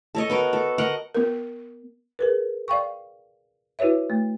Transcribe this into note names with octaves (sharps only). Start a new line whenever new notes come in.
A4 C#5 D#5
B3 F#4 A#4
A4
A#4 D#5 F#5
B3 A#4
G#4 A#4 B4
D5 F5 G5 C#6
E4 F#4 B4 C#5 E5
A3